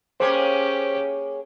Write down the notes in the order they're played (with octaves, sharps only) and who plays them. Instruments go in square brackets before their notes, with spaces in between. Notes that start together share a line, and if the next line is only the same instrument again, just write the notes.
[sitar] A#3 G#4 C#5 [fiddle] C#4 G4 [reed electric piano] C5